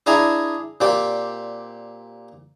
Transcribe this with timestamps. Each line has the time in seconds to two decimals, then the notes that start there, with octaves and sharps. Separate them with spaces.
0.06 D4 E4 G#4 G#5 A#5
0.81 A#2 C4 G4 D5